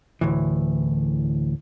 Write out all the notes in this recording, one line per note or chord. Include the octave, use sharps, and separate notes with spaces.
D2 A2 E3